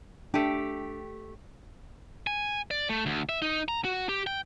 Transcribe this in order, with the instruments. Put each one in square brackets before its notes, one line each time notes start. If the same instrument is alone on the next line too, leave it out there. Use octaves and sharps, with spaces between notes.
[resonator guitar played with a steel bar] A3 G4 [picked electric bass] D4
[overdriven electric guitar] G#5
D5
A3
D2
E5
D#4
A#5
F#4
G4
G5